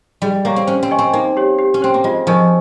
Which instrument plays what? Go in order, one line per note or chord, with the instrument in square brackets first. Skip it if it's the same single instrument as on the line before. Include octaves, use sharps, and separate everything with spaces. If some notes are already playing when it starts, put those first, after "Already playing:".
[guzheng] G3 [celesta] G#4
[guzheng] A#3 [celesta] C#5 F5 A#5 C#6
[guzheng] C4
[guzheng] C#4 [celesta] C5
[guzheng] C4
[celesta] D#5 G#5 C#6
[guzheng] C4
[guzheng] A#3 [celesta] D#4
[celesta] G4 C#5
G4
[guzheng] C#4
[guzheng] C4 [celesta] C5 G5 C6
[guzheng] A#3
[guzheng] G#3 [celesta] F4
[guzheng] F3 [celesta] A#4 D#5 G#5 C#6